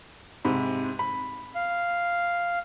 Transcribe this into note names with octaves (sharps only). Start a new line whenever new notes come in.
G#2 C3 B5
B5
F5